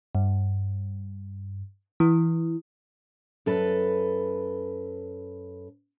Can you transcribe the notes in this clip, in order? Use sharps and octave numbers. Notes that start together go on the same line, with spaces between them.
G2
E3
F#2 A4 B4